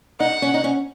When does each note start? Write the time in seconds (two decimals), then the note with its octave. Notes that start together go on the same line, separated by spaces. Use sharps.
0.20 D#4 F#5
0.42 C#4
0.54 D#4
0.64 C#4